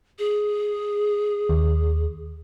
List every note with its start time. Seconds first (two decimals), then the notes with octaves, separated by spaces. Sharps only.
0.19 G#4
1.49 D#2